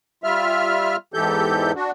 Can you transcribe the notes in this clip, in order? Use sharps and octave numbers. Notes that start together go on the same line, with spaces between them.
G3 F4 E5 F6
E2 G#2 E3 G4 A4 G6
D4 F#4